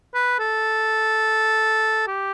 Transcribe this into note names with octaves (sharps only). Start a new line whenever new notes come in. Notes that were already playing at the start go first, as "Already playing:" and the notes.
B4
A4
G4